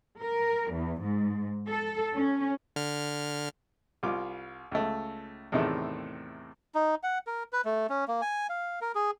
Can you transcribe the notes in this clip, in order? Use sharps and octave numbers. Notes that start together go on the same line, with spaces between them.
A#4
E2
G#2
A4
C#4
D3 F6
C2 F4 D6
C#2 A3
E2 A2 C3 D#3 A3
D#4
F#5
A#4
B4
A3
C#4
A#3
G#5
F5
A#4
G#4